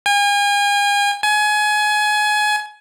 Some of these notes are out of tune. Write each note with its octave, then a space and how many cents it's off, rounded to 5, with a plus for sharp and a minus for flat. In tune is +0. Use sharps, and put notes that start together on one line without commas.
G#5 -40
G#5 +25